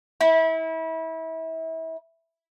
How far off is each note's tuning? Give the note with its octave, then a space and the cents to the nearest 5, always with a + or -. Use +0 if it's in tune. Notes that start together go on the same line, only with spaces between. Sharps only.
E4 -30